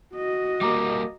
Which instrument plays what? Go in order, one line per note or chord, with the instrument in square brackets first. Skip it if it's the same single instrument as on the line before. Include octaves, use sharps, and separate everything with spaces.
[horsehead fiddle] F#4 D#5
[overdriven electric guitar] G3 A#3 [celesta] A#5 D6